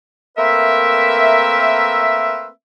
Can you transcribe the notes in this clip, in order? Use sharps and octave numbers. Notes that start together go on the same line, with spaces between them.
A3 A#3 C4 A#4 B4 E5